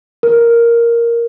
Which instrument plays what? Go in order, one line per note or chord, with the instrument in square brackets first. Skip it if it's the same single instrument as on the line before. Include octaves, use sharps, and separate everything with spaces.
[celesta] A#4